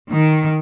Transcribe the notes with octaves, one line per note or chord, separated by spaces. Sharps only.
D#3